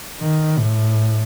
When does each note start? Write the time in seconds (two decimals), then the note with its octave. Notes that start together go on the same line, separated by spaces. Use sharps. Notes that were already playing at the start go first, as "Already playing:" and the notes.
0.20 D#3
0.58 A2